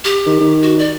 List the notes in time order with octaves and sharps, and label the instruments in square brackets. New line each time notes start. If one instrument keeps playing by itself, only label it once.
[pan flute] G4
[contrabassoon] D#3
D#3
[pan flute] F#4
D5